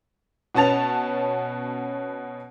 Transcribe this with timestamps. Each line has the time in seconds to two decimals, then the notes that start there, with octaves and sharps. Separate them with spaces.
0.55 B2 B3 C#4 A5 A6 F7